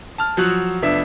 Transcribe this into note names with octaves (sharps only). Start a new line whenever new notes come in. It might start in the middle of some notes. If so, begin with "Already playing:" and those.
A5 F6
F3 F#3 F#4 F#5 F#6
F1 B3 D4 E5